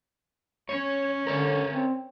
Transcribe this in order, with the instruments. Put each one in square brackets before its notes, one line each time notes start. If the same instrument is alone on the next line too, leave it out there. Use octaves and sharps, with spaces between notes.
[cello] C#4 [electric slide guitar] C#5
[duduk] D3 [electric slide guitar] A#4 C#5 D5
[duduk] C4